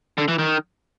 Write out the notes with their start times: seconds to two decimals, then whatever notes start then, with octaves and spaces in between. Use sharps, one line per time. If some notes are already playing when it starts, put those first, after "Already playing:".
0.18 D3
0.28 E3
0.39 D#3